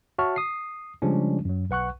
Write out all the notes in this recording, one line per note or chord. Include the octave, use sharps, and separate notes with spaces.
F#4 C#5 E5 A5 C#6 F6
D#6 C7
C#3 F3 G3 G#3 C#4 D4
F#2 F#3
B1 B4 F#5 C#6 F#6